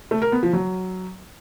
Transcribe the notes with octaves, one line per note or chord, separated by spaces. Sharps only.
A3
A#4
B3
F3
F#3